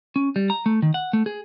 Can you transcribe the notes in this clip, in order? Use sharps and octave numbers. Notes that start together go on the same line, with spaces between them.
C#4
G3
A#5
A3
D#3
F#5
A3
G#4